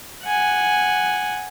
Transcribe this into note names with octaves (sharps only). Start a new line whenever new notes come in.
F#5 G#5